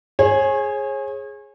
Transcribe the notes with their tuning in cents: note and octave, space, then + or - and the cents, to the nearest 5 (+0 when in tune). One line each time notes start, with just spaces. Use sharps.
G#4 +0 C#5 -35